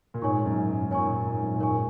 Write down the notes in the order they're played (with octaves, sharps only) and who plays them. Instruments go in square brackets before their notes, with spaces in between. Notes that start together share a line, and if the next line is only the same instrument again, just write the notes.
[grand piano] A#2
[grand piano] G#2 [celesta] C#5 G#5 C#6
[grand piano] F#2
G#2
[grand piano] A#2 [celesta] C#5 G#5 C#6
[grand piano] G#2
G#2
F#2
A#2
[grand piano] G#2 [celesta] A#4 C#5 G#5 C#6